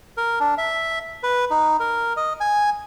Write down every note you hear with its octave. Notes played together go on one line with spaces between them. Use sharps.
A#4
D4
E5
B4
D#4
A#4
D#5
G#5